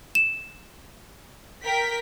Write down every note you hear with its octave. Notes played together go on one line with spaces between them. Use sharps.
E7
A#4 G5 B6